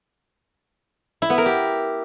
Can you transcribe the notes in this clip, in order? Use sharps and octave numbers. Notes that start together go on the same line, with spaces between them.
E4
B3
A#4
G4